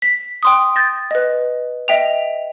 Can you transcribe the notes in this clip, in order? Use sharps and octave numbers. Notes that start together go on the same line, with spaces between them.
B6
G5 C6 D#6
G6 A6 A#6
B4 D#5
D#5 E5 G5 F7